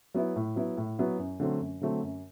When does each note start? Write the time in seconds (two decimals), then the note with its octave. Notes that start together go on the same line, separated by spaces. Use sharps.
0.14 F#3 B3 E4
0.36 A2
0.56 F#3 B3 E4
0.77 A2
0.99 F#3 B3 E4
1.19 F#2
1.40 D3 F#3 A3 C4
1.61 F#2
1.81 D3 F#3 A3 C4
2.03 F#2